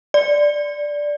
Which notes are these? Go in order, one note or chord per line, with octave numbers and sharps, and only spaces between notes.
D5